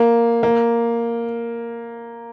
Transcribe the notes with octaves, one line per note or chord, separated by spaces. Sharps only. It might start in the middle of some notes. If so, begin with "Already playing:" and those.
Already playing: A#3
A#3